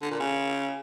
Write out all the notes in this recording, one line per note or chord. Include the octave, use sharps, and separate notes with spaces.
D3
A#2
C#3